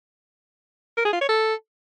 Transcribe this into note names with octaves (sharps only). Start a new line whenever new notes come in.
A#4
G#4
F4
C#5
A4